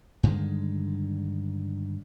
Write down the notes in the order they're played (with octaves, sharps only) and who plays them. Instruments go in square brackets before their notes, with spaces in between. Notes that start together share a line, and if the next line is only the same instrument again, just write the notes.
[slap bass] G2 D3 D#3 G#3